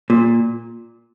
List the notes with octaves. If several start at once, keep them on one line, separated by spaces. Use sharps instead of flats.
A#2